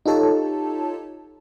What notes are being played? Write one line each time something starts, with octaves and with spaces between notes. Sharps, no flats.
D#4 F4 G4 A4 C#5 A5